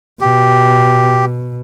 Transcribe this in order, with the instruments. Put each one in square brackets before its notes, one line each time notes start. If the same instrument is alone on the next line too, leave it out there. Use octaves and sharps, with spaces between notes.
[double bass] B2 [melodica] G4